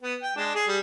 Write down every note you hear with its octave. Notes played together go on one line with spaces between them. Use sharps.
B3
G5
G#3 D4
G#4
G3